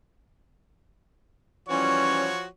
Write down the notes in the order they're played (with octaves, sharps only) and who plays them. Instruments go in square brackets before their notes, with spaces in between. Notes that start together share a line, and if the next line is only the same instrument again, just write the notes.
[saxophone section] E3 G3 C#4 [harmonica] F3 F#4 [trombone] C#5 [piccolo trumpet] C#6